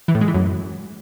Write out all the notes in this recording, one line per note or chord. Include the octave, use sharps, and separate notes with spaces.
E3
A2
G#3
E3
F#2